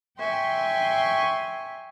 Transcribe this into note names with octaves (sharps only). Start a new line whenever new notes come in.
E5 G5 G#5 C6 C#6